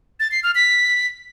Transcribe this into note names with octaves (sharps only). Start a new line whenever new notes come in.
A6
C7
F6
B6